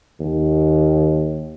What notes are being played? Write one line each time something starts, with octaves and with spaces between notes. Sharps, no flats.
D#2